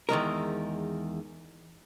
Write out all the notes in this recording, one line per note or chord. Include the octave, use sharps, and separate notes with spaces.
E2 D#3 G#3 A#4